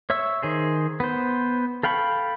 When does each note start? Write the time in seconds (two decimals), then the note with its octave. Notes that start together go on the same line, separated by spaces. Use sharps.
0.10 C#5 E5 C#6 E6
0.43 D#3 G#4 C5
1.00 B3 C5
1.83 A4 F5 G5 B5 C#6